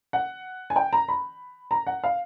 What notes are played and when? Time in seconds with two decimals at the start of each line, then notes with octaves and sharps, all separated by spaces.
0.13 F#5
0.70 G#5
0.76 G5
0.93 A#5
1.08 B5
1.71 A#5
1.87 F#5
2.04 F5